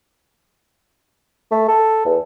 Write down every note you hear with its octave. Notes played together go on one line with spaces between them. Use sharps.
A3
A4
E2